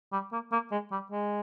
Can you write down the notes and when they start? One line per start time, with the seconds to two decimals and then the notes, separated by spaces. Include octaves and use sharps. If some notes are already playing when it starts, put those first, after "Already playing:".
0.12 G3
0.32 A#3
0.52 A#3
0.71 G#3
0.91 G3
1.11 G#3